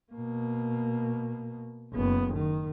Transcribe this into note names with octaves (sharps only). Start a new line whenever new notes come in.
B2 A#3
F#1 B3
D#3